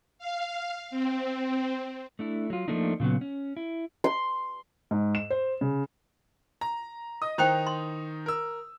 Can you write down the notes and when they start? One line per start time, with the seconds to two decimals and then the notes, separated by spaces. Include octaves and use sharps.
0.19 F5
0.91 C4
2.19 A3 D4 E4
2.50 F#3 F4
2.68 F3 G3 A3 A#3 D4 D#4
3.00 A#2 C#3 F#3 B3
3.21 C#4
3.57 E4
4.04 C6
4.91 G#2
5.15 E7
5.30 C5
5.61 C#3
6.61 A#5
7.22 D#5 D#6
7.38 D#3 D#4 E4 C5 G5 F7
7.67 C6
8.26 A#4 E6